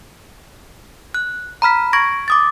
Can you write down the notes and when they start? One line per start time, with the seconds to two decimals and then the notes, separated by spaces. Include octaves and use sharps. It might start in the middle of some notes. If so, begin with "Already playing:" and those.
1.14 F#6
1.62 A#5 B5 F6 B6
1.93 C#6 G#6 A#6 D7
2.28 D6 D#6 A6